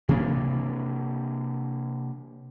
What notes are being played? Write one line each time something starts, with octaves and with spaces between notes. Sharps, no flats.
C3 E3 A#3 D4